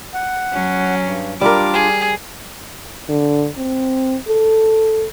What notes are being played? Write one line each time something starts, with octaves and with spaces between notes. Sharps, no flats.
F#5
F#3 C#4
G2
G3 D4 F4 A#4 D6
G#4
D3
C4
A4